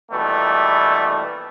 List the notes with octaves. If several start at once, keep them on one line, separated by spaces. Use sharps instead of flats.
A#1 B2 E3 G3 A3